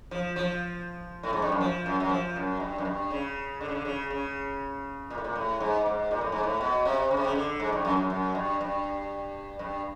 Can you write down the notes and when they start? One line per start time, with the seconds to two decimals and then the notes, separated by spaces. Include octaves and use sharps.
0.11 F3
0.36 F3
1.23 A2
1.33 G#2
1.42 G2
1.52 F#2
1.61 F3
1.86 F#2
2.00 F#2
2.10 F3
2.36 F#2
2.60 G2
2.78 F#2
2.85 G2
3.11 C#3
3.61 D3
3.68 C#3
3.75 D3
3.85 C#3
4.10 C#3
5.10 A#2
5.18 A2
5.24 A#2
5.36 A2
5.60 G#2
5.86 G#2
6.11 A#2
6.21 A2
6.32 G#2
6.43 A2
6.61 B2
6.85 C3
7.11 C#3
7.17 C3
7.25 C#3
7.35 D3
7.60 G#2
7.72 G2
7.85 F#2
7.97 F#2
8.10 F#2
8.35 G2
8.61 G2
9.59 G2